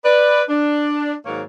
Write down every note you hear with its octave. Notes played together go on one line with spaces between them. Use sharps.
B4 D5
D4
G#2 D#3 F#3 A#3 A#4 C#5